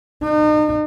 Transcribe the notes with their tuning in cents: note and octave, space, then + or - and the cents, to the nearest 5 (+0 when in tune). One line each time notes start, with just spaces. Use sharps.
D#4 -40